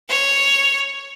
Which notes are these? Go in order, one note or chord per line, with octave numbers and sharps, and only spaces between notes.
C#5